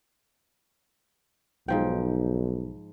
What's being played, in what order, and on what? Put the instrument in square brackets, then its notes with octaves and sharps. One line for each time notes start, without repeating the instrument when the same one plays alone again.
[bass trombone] B1 [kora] G#2 F3 G5